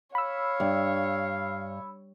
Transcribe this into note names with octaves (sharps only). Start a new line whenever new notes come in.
C#5 F5 B5 E6
G2